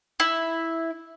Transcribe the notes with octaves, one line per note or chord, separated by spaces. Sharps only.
E4